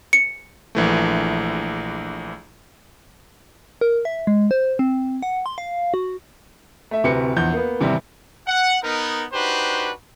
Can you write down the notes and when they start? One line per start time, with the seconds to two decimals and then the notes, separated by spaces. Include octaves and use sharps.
0.13 C#7
0.75 A#1 E3 A3
3.81 A#4
4.05 E5
4.27 G#3
4.51 C5
4.79 C4
5.23 F#5
5.46 C6
5.58 F5
5.94 F#4
6.91 A3 E5
7.04 D1 C3 F#4 B4 C#7
7.36 A#1 E2 G6
7.53 A#3 B3
7.81 G#1 C3 E3 G3
8.48 F#5
8.83 B3 D#4 A#4
9.33 D4 D#4 F#4 G4 B4 C5